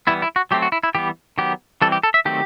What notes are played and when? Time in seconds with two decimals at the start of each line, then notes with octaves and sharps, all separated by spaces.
0.07 E3 G3 B3 E4
0.22 E4
0.36 F#4
0.51 F#3 A3 C4 G4
0.62 F#4
0.72 E4
0.83 E4
0.95 E3 G3 B3 G4
1.38 D#3 F#3 B3 G4
1.82 E3 G3 C4 A4
1.92 G4
2.03 A4
2.14 E5
2.25 D#3 F#3 A3 C4 G4